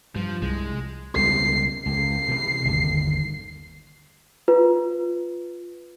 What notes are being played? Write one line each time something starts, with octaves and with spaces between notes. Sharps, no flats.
G2 F3
C2 G#3
C#2 G3 B3 C7
C#2 C7
C3 E3
G1 D#2
F4 B4